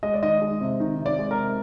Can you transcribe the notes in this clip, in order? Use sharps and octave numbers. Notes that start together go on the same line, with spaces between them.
G#3 D#5
D5
D#3 D#5
G#3
C3
D#3
C3
D5
G#3
A#4
C3